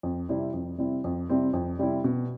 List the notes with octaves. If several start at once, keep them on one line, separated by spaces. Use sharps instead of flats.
F2
C3 G3 C4 E4
F2
C3 G3 C4 E4
F2
C3 G3 C4 E4
F2
C3 G3 C4 E4
B2